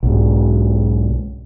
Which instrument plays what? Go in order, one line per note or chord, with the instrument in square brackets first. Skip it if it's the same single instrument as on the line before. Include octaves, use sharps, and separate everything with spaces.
[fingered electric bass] B1 G#2